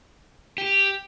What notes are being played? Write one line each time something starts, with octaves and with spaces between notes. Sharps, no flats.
G4